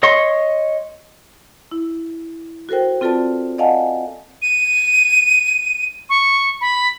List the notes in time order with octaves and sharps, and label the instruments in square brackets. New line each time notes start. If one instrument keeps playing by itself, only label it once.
[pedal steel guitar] C#5 D#5 C6 C#6
[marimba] E4
F#4 A4 A#4 C5 G5
C4 F4 A4 B4 D5 A5
D5 D#5 F5 F#5 G#5 A5
[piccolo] D#7
C#6
B5